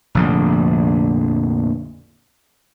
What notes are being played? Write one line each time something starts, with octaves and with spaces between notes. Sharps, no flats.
F1 A#1 D3